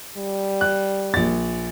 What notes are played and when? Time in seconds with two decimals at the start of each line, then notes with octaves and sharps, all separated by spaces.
0.17 G3
0.61 F#6
1.14 A#1 A6